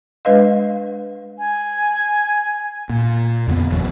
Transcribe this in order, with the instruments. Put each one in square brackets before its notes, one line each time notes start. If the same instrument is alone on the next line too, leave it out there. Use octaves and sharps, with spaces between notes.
[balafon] G#3 D4 B4 D#5 F5
[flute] G#5
[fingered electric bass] A#2
F2 D3 A3 B3
F#1 E2 F#3